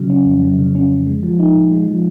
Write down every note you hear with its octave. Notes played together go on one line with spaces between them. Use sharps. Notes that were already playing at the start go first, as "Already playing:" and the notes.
Already playing: C#3 F#3
C#4
F2
F#3
C#3
C#4
F2
G#3
F3
D#4
A#2
G#3
F3